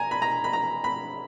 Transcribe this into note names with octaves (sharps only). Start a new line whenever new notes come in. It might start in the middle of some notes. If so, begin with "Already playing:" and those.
Already playing: G#5 A#5
B5
A#5
B5
A#5
B5